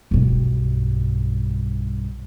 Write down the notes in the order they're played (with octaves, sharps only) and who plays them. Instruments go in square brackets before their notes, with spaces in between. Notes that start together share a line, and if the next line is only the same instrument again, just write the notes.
[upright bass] B1 G2